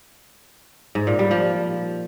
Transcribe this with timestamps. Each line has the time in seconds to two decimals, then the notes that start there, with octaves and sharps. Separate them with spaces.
0.95 G#2
1.07 A#2
1.19 G3
1.31 F3